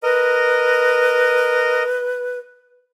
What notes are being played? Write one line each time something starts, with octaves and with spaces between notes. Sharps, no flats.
A#4 B4 D#5